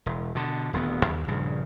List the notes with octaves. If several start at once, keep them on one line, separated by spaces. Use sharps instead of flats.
E1
B2 D3
D#1 D2 F#3 B3
D#2
A#1 G2 C#3